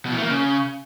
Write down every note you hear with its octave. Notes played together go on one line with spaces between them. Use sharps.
B2
E3
A3
A#3
C#3